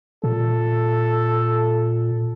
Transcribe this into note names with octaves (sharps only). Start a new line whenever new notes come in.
A#2 A4